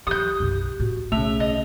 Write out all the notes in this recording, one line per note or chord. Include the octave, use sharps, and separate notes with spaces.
E3 F#3 G4 D#6 G6
B1 F#2
A2 F#4
B1 C#3 A3 E5 F7
D#5